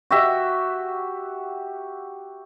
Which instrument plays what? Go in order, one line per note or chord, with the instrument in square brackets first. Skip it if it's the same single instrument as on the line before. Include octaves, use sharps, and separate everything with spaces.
[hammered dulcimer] F#4 G4 E5